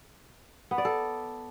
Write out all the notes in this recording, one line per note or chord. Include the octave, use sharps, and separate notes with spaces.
B3
D5
A4